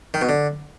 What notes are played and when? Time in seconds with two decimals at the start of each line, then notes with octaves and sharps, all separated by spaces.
0.14 D#3
0.21 B2
0.29 D3